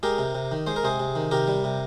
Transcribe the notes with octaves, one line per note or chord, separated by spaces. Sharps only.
G#3 G4 A#4
C3
C3
D#3
G#3 C5
A#4
C3 G#4 C5
C3
D#3
C3 G4 A#4
G3
C3